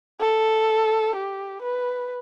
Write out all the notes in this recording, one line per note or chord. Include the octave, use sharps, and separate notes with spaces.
A4
G4
B4